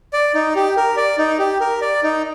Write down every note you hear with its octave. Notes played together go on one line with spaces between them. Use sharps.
D5
D#4
G4
A#4
D5
D#4
G4
A#4
D5
D#4